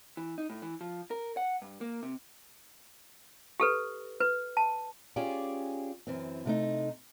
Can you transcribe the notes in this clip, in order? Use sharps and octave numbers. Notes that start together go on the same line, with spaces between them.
E3
D#4
A2
E3
F3
A#4
F#5
G2
A#3
C3
G4 A4 B4
B4
A5
C#4 F4 G4 G#4 D5
F#2 E3 C4
C3 A3 D#4